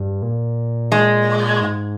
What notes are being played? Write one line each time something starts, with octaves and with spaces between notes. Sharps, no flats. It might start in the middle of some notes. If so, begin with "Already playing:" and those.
Already playing: G2
A#2
G#3
G#2